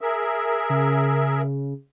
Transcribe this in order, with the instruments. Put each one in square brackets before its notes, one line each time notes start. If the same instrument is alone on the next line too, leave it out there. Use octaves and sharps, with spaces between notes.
[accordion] G#4 A#4 E5
[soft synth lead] C#3